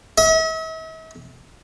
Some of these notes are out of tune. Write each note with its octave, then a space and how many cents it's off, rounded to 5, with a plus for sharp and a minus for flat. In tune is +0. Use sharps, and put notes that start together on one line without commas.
E5 -45